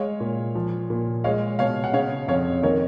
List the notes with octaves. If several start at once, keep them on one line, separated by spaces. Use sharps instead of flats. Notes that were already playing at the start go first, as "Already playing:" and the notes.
Already playing: G#3 C#5 F5
A#2
F3
A#2
G#3 C#5 F5
B2 C#5 F5
F#5
C#3 C#5 F5
F2 C#5 F5
D#3 A#4 C#5